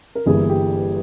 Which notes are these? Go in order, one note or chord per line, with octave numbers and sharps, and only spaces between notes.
A#4
G1 G2 E3 A#3 G#4
G4